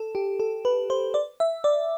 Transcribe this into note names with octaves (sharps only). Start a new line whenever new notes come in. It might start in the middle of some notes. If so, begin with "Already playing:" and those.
Already playing: A4
G4
A4
B4
C5
D5
E5
D5